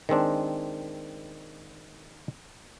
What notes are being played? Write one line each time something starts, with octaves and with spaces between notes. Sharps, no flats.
D#3 G#3 C4 D4